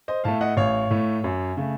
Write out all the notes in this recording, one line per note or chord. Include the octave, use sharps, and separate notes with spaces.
C5 D#5
A2 A3 F5 A5
D#5 F#5
A1 C#5 F5
A2 A3
F#2
C#3 A3